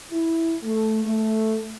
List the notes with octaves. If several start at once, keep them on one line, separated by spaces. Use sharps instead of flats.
E4
A3
A3